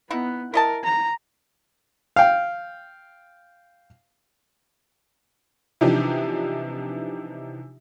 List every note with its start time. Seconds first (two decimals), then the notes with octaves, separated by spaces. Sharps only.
0.11 B3 D#4 E4 F#5
0.54 E4 A#4 D#5 A5
0.84 A#5
2.16 F5 G5
5.81 C3 E3 F3 D4 D#4 G4